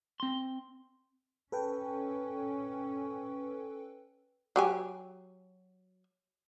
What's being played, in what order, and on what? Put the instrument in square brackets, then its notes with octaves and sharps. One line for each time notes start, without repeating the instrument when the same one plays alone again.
[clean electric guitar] C4 C6
[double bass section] C#4 [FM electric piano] A4 B4 G5
[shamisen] F#3 G4 G#5